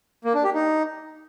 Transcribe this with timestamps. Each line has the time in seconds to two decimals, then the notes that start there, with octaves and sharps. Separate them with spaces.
0.25 A#3
0.34 D4
0.44 G4
0.54 D#4